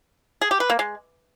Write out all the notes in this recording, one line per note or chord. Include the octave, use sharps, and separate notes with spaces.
G#4
G4
B4
A#3
G#3